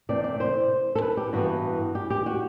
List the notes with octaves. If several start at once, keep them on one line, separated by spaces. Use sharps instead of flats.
C3 E3 A3 C4 D5
D5
C5
A4
B4
G4
G2 E3 B3 F#4
G4
G4
F#4